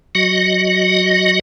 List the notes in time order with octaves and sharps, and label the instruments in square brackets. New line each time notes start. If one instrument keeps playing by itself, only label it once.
[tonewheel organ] F#3 F#4 D#5